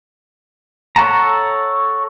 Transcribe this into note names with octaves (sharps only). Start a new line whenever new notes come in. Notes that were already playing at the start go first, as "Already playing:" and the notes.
A4 C#5 F#5 A5 A#5